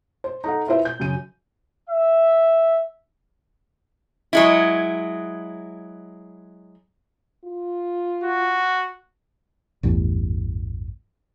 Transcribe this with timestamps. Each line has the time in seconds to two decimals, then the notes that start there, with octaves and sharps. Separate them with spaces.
0.24 C5
0.44 D#4 A4 F#5
0.67 E4 F4 B4 C5 E5
0.85 G6
0.99 F#2 C#3 D#7
1.88 E5
4.33 F#3 G#3 E4
7.45 F4
8.24 F#4
9.83 A1 E2 G2